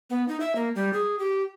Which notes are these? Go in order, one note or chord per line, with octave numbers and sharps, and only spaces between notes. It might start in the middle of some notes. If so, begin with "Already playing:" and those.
B3
D#4
E5
A#3
G3
G#4
G4